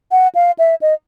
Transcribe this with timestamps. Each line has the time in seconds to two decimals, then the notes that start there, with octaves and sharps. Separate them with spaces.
0.11 F#5
0.35 F5
0.58 E5
0.81 D#5